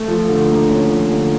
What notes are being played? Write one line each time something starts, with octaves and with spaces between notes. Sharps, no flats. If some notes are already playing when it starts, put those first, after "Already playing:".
Already playing: A3
F3
D3
A#3
C#4
F3
D3